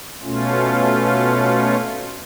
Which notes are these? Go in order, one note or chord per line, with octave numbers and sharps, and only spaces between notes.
B2 A3 C#4 F4